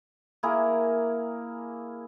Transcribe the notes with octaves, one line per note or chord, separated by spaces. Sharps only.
A#3 E4 G#4 A#4